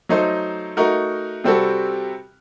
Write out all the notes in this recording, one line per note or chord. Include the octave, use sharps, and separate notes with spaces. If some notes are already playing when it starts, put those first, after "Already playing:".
F#3 A3 D#4 A4 C5
A3 D#4 F#4 A#4
C3 G3 C4 F#4 A4